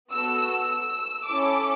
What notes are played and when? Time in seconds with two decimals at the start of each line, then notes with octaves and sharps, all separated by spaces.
0.11 B3 F#4 A4 E6
0.40 E6
0.69 E6
1.27 C#4 E4 A4 D6